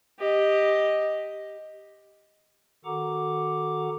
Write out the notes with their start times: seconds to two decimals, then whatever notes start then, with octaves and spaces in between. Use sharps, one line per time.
0.19 G4 D#5
2.85 D#3 F#4 A4 F#5 A#5 D6